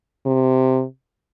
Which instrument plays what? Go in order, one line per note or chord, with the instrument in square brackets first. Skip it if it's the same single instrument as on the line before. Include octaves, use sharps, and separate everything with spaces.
[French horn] C3